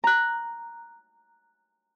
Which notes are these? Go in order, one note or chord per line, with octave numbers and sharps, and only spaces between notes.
A#5 F#6